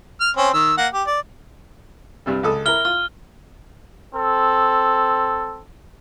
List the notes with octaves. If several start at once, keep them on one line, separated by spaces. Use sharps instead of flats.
F6
C4 C#4 C5
D#3 E6
A#3 F#5
G4
D5
G2 C3 G3
C#2 A4 D#6
E4 A#4 F6 G7
F4 F6
C4 A4